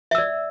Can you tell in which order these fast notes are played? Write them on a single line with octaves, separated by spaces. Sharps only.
E5 E6 D5